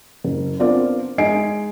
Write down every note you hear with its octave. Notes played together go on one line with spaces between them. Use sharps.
F#1
B3 C4 D4 F4 A#4 D5
G#3 D#4 D#5 G#5 C7 D7